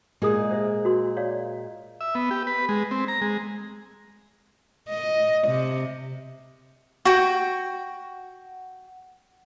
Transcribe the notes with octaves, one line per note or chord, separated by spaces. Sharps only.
A#2 G#3 G4 G#4 A#4 D#6
C5 E5
F#4 A#4 C6
C#5 D5 F5
E5
B3
G4
B4
G#3
C4
A#5
G#3
D#5
C3
F#4 G5